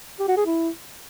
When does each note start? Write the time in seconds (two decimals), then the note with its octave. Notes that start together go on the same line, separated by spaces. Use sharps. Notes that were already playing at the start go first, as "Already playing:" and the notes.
0.19 G4
0.28 F#4
0.37 G#4
0.46 E4